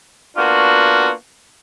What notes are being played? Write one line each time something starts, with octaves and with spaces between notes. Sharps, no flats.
A#3 B3 D4 F4 F#4